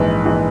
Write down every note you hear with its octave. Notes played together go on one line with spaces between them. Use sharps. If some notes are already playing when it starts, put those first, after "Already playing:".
Already playing: A#1 G#2 E3 B4
A#1 G#2 E3